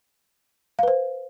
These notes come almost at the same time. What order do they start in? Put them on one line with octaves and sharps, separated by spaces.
F5 B4 C5